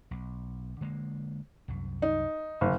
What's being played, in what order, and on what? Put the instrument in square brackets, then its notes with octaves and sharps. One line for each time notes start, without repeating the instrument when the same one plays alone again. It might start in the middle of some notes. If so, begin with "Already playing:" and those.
[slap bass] B1
D3 G#3 A#3
C2 F#2
[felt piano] D#4
[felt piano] F#1 [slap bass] G2 D3 B3